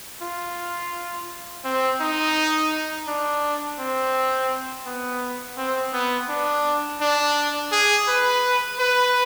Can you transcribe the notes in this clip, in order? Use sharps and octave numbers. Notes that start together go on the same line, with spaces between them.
F4
C4
D#4
D4
C4
B3
C4
B3
D4
D4
G#4
B4
B4